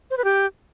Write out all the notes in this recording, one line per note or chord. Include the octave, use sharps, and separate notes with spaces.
C5
B4
G4